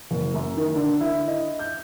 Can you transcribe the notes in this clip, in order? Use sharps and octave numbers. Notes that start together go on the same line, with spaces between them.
F#1
F#2
D#3
D3
E4
D#5
G6